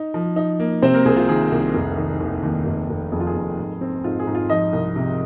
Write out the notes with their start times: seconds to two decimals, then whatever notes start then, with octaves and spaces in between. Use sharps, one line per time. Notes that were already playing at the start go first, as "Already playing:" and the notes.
Already playing: D#4
0.14 F3
0.36 D#4
0.60 A#3
0.82 C3 C4 C5
0.94 A#3 A#4
1.05 C2 G#4
1.17 F4
1.28 D#3 G#4
1.51 C2
1.74 F1
1.98 D#3
2.21 D#2
2.43 D#2
2.66 F1
2.90 F1
3.12 F2 G#4
3.20 F4
3.27 G#4
3.36 F2
3.58 G#2
3.81 C4
4.04 G#2 F4
4.19 G#4
4.27 G#2
4.35 F4
4.50 F3 D#4 D#5
4.73 C2
4.96 C3